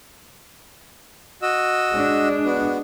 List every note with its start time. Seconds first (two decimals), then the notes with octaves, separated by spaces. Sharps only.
1.42 F#4 D#5 E6
1.94 G#3 D4
2.45 B3 F#4